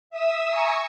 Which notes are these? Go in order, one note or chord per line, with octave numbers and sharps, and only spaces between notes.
E5 D#6 E6
G#5 A#5 C#6 D#6 E6